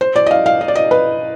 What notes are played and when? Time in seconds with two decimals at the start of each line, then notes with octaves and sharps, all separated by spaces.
0.01 C5
0.16 D5
0.26 D#5
0.31 F5
0.46 F5
0.61 D#5
0.68 D5
0.76 D#5
0.91 B4